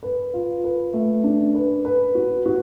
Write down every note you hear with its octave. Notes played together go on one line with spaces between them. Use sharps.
B4
F4
B4
A3
D4
B4
B4
F#4
F#4